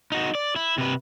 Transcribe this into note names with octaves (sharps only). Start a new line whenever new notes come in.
D#4 F#4
D5
E4
C3 B4